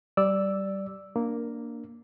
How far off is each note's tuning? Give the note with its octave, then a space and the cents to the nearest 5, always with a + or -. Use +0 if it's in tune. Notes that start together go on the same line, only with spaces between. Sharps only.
G3 -15 D5 +0 E6 +0
A#3 +0 D4 +0